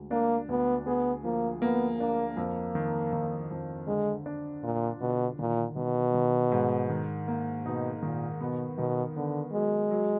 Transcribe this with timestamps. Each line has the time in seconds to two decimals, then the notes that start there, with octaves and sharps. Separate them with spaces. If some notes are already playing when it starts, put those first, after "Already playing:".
Already playing: D2 G#3
0.11 A#3 D4
0.49 D2 B3
0.87 B3 G#4
1.24 F3 A#3
1.61 A#3 B3
1.99 A#3 D4
2.37 F2 A#3
2.75 D#3
3.13 D#3
3.51 F2
3.88 D3 G#3
4.26 D4
4.63 A#2 F4
5.01 B2 D3
5.39 A#2 D#3
5.76 B2 D#3
6.14 D#3
6.52 G#2
6.90 D#3
7.28 A#3
7.65 B2 D#4
8.03 A#2 D#3
8.40 B2 B3
8.77 B2 D#3
9.16 D3 B3
9.53 F#3 G#3
9.91 F#3